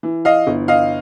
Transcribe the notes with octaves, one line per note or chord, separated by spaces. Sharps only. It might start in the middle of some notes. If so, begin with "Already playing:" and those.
E3
D#5 F5
G1
D#5 F5